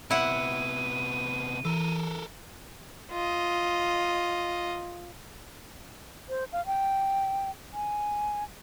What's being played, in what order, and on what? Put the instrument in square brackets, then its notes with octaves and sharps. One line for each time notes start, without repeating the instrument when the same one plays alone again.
[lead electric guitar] C3 B3 [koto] E4 F#5 [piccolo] D#7
[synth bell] E3 [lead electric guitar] A4 A#4
[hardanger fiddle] F4 D#5
[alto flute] C5
F5
G5
G#5